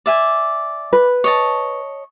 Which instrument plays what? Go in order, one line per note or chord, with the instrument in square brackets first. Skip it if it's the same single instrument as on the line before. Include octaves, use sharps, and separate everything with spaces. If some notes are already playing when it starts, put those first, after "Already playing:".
[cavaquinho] D5 E5 G#5
[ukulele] B4
[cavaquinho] C#5 D#5 A5